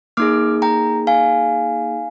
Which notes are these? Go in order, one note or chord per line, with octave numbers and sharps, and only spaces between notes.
A#3 D#4 G#4 D6 F6
G5 A#5
F5 G#5